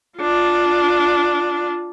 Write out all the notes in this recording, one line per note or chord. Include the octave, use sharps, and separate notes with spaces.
D4 F4